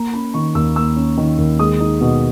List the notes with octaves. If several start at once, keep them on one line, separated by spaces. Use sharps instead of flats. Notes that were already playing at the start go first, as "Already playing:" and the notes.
Already playing: A#3 A#5
C#4 B5
D#3 C#6
D#2 E6
A#3 E6
C#4
D#3
D#2
G#3 D#6
D#4
B2